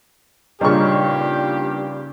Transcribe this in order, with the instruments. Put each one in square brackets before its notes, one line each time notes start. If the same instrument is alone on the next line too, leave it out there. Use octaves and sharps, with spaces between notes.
[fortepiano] G2 A#2 C#6 [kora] C#3 D#4 [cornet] G4